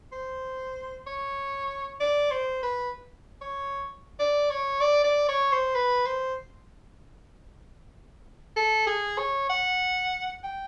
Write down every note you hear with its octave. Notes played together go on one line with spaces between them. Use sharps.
C5
C#5
D5
C5
B4
C#5
D5
C#5
D5
D5
C#5
C5
B4
C5
A4
G#4
C#5
F#5
G5